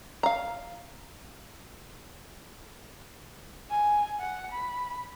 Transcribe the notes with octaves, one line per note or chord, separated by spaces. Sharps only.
F5 A#5
G#5
F#5
B5